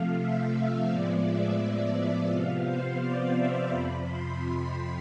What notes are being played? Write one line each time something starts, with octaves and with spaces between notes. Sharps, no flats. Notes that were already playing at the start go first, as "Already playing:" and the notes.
Already playing: C3 F3 A3 F5
E5
A2 F3 G#3 B3 D5
E5
D5
E5
C3 F3 B3 F5
C5
D5
E5
F2 C3 F3 B5
C6
B5